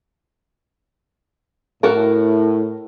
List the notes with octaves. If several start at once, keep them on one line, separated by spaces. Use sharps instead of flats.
A2 F#4 A4 A#4